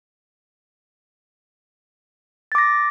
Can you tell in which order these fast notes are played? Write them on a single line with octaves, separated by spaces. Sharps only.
A6 D6 A#6